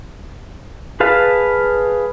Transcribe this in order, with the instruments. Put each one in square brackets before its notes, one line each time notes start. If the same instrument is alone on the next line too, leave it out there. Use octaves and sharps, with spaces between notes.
[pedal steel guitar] G#4 B4 F5 A5